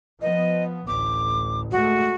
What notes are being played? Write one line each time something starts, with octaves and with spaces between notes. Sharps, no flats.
F3 B3 D#5
A1 D2 D6
G#3 A3 F#4